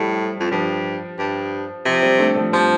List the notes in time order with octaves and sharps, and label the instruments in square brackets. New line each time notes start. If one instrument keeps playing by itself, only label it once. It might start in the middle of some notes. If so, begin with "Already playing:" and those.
Already playing: [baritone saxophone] A2 [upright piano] F3 G3
[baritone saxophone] F2
[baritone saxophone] G2 [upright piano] F3
[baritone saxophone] G2
[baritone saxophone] C3 [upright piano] F3
[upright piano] G3 C4
A3 D4
F3 A3
[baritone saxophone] F3 [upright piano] G3 C4